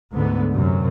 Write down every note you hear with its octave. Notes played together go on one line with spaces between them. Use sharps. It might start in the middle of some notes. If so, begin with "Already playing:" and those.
D2 G#2 D3 B3
F#2 C3